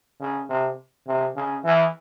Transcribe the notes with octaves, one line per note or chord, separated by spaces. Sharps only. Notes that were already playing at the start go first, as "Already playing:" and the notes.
C#3
C3
C3
C#3
E3